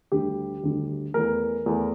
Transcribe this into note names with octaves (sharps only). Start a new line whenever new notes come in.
D2 D3 G3 G4
D2 D3 G3
E2 E3 A3 A#4
E2 E3 A3